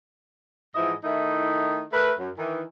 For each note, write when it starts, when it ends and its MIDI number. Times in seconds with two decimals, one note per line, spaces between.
0.75 0.93 44
0.75 0.93 52
0.75 0.93 53
0.75 0.93 64
0.75 0.93 75
1.04 1.83 51
1.04 1.83 57
1.04 1.83 63
1.04 1.83 64
1.93 2.12 57
1.93 2.12 70
1.93 2.12 71
2.18 2.30 42
2.38 2.63 51
2.38 2.63 52